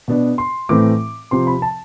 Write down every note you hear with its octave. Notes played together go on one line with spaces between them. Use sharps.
B2 B3 D4
C6
A2 E3 A3 C4 D6
C3 F3 C4 C6
B5
A5